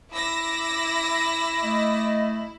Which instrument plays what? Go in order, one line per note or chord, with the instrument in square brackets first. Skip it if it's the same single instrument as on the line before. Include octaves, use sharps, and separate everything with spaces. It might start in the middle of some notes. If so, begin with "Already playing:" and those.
[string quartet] E4 [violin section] D6 E6 A#6
[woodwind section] A3 D#5